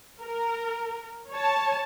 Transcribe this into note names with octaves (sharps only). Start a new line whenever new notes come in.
A#4
C#5 A5